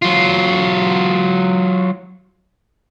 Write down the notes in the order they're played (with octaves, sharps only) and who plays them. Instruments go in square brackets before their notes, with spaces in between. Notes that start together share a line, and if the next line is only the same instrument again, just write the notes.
[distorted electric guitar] F#3 F4